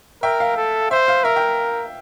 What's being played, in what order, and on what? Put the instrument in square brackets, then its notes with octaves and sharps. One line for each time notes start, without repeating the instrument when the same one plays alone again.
[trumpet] A#4 [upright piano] E5 G5
[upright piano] F5
[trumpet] A4
[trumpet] C5 [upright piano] E5
[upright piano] F5
[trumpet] A#4 [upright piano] E5
[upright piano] E5 G5